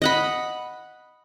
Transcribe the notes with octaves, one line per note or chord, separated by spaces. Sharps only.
D#5 F#5 B5